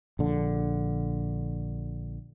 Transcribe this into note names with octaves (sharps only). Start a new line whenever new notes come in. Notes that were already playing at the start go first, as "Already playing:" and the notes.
A#1 D3